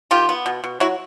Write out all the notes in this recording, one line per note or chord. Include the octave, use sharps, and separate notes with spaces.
D#3 F4 G4
B3
B2
B2
F#3 E4 F#4